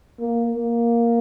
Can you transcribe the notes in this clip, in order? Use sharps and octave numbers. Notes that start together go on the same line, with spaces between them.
A#3
A#3